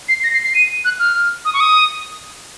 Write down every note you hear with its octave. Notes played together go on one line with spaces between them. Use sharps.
C7
A#6
C7
C7
D#7
F#6
F6
D#6
C#6
D#6